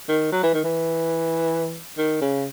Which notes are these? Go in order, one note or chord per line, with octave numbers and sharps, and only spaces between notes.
D#3
F#3
E3
D#3
E3
D#3
C#3